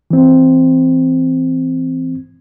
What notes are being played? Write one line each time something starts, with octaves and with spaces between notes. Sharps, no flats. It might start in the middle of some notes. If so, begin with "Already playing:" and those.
E3 C4